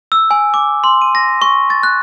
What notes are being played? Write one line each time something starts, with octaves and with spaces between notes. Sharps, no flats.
E6
G#5
D6
C6
D#7
A#6
C#6
A6
F#6